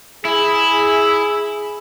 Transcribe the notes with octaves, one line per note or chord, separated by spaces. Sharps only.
E4 G#4